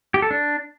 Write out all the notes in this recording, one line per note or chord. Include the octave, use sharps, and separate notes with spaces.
G4
A4
D4